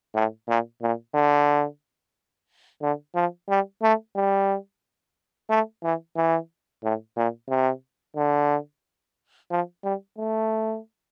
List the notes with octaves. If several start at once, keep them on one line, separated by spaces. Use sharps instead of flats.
A2
A#2
A#2
D3
D3
F3
G3
A3
G3
A3
E3
E3
A2
A#2
C3
D3
F3
G3
A3